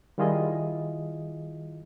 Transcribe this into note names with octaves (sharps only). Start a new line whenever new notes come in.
D#3 G3 E4 F4 G#4 D#5